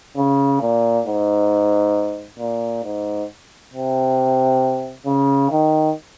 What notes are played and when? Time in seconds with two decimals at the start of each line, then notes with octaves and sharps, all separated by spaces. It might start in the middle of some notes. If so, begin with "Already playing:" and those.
0.17 C#3
0.61 A#2
1.06 G#2
2.39 A#2
2.84 G#2
3.74 C3
5.06 C#3
5.51 D#3